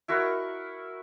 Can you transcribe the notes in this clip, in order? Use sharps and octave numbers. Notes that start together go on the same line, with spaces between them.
E4 F#4 A#4 C#6